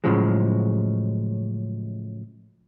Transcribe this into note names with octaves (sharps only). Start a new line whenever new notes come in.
A2 C#3 F3 F#3 G#3